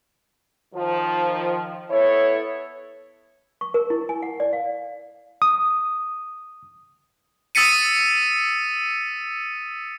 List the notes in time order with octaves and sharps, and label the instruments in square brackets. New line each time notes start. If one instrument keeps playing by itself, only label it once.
[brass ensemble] D#3 F3
B3 E4 A4 C#5
[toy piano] C#6
A#4
E4
G#5
F#5
D5
F5
[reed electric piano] D#6
[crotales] D#6 E6 A6 B6 C#7 D#7